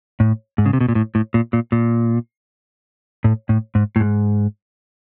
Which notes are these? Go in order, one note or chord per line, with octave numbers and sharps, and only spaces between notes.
A2
G#2
C#3
C3
B2
A#2
A2
A2
A#2
A#2
A#2
A2
A2
G#2
A2
G#2